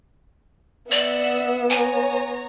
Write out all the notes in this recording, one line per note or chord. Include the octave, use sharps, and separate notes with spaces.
B3 D5 E5 F#5 E6
C#5 G#5 A#5